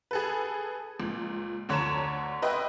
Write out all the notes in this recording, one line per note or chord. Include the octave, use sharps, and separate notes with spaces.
G#4 A4 B4
C#2 A#2
D2 D3 C#5 A5 A#5 E7
B4 D#5 E5 G5 C6